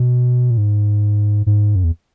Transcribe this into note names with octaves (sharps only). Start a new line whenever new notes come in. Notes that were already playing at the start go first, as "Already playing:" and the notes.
Already playing: B2
A#2
G#2
G#2
F#2
E2